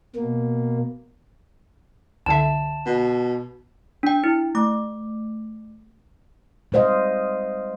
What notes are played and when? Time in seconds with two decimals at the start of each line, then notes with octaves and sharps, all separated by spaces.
0.16 B2 A#3
2.26 C2 D3 E5 A5
2.86 B2
4.03 D4 G5
4.24 E4
4.55 A3 D6
6.72 G3 G#3 C5 D#5 F5